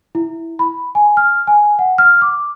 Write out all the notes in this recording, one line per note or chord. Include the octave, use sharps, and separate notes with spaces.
E4
B5
G#5
F6
G#5
F#5
F6
D6